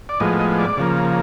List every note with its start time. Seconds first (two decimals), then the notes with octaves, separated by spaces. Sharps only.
0.09 D5
0.20 A2 F3 G#3 B3 D#5
0.39 D#5
0.59 D5
0.77 C#3 F3 A#3